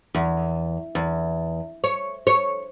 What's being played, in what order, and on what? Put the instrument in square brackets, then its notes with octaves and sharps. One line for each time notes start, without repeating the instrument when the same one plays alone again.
[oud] E2
E2
C#5
C#5